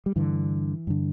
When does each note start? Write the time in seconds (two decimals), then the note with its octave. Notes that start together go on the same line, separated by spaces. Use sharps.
0.06 G3
0.16 G2 D3 E3
0.87 G2 D3